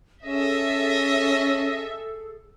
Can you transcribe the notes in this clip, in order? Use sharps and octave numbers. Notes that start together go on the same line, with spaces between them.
C#4 G#4 A4 D#5 E5